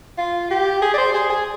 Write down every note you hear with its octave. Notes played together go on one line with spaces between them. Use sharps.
F4
G4
G#4
D5
C5
G#4
G#4